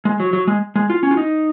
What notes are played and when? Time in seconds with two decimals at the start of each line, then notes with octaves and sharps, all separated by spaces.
0.05 G#3
0.20 F#3
0.33 F#3
0.47 G#3
0.76 G#3
0.90 F4
1.03 C#4
1.11 F4
1.17 D#4